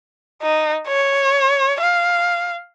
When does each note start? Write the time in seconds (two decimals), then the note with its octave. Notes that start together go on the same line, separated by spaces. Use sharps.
0.42 D#4
0.88 C#5
1.80 F5